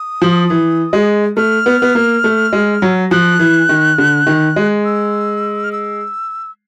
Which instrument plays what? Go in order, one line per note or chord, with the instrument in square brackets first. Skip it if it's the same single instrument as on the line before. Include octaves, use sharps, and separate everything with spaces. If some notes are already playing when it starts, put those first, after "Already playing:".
Already playing: [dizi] D#6
[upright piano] F3
E3
G#3
[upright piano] A3 [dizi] F6
[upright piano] B3
B3
A#3
A3
G#3
F#3
[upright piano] F3 [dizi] F#6
[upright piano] E3
D#3
D3
D#3
G#3
[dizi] E6
F6
E6